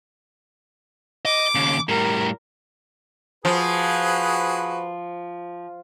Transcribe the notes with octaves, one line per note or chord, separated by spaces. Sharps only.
D#5 D6
D#2 C#3
A2 G3 A#4
F3 F#4 G#4 B4